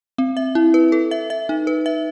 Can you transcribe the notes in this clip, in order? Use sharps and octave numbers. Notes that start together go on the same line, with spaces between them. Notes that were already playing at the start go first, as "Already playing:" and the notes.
C4
E5
E4
B4
A4
E5
E5
D#4
B4
E5